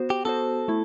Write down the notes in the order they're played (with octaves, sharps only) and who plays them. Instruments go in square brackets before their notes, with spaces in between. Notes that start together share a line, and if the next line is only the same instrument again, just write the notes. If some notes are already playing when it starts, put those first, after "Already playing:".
Already playing: [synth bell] B3 F#4 C5
[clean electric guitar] G4
[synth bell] B3 F#4 C5 [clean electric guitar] A4
[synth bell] A3 E4